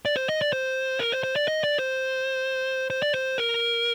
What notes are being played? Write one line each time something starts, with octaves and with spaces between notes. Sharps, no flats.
D5
C5
D#5
D5
C5
A#4
C5
C5
D5
D#5
D5
C5
C5
D5
C5
A#4